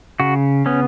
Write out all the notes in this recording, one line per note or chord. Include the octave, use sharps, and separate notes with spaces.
C#3 F#4
B3 C#4